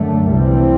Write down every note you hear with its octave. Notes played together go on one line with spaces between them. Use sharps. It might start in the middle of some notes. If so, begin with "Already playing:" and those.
Already playing: F#2 D3 A3
C2 C3 E3 G3 C4